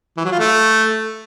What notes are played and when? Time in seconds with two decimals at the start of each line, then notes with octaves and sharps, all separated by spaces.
0.17 E3
0.24 F#3
0.32 F4
0.39 A3